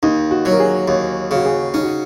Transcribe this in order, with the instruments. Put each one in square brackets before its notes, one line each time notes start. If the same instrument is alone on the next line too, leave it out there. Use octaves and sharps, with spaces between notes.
[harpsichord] D#2 [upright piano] D#4
[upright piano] F#4
[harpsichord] F#3 [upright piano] C#5
[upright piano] A#4
G#4
[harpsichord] D#2 [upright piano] C#5
[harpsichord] C#3 [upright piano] F#4
[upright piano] G#4
[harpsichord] C#4 [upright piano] D#4
[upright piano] F#4